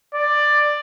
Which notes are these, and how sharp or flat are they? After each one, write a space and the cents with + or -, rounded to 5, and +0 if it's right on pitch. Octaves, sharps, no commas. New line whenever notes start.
D5 +10